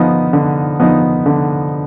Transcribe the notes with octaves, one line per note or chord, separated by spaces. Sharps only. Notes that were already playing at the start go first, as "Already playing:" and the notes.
Already playing: D3 F3 B3 D#4
D3
F3 B3 D#4
D3